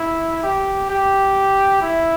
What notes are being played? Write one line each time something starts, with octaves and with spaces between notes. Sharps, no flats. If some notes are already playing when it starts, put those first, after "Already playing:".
Already playing: E4
G4
G4
E4